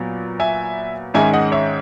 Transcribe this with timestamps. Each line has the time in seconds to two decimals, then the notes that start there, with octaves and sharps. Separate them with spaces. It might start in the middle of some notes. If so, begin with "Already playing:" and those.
Already playing: A#2 F#3 B3
0.40 E5 G#5
1.14 G#2 D#3 G#3 C#4 E5 G#5
1.33 D#5 F#5
1.52 C#5 E5